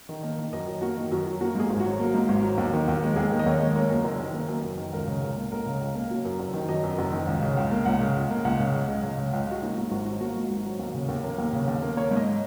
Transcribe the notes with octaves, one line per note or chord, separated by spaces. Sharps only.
D#3
A#3 D#5
D#3
F#2 D#5
F#3
A#3 F#4
D#3
F#2 F#4
F#3
A#3 F#4
G#2 G#4
G#1
F#4
F#3
A#3
G#2
G#1
F#3
D#2
D#3
D#2
G#3
D#2 G#4
D#3
D#5
D#2 C#5
G#3
A#3 C#5
F#2
F#1
D#3
A#3
F#2
F#1
D#3
C#2 A#4
C#3
C#2
A#3
C#2 A#4
C#3
C#2
A#3
F#3
F#2
F#1
D#3
F#3 D#5
F#2
F#1
D#3
C#2
C#3
C#2
A#3
C#2 F#5
C#3
C#2
A#3
C#2 F#5
C#3
C#2
G#3
C#2
C#3
C#2
G#3 F#4
A#3 D#4
G#2 F#4
G#1 F#4
F#3 F#4
A#3 F#4
G#2
G#1
F#3
D#2
C#3
D#2
A#3
D#2
C#3
D#2
A#3
A#3 C#5
G#2
D#5